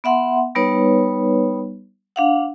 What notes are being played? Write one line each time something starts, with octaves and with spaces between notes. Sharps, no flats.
B3 E5 F#5 C6
G3 B3 D#4 B4 C#5
D4 F5 F#5